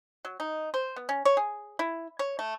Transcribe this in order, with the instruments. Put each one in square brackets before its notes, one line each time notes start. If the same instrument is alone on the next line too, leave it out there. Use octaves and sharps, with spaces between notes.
[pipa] F#3
D#4
C5
B3
C#4
C#5
G#4
E4
C#5
A3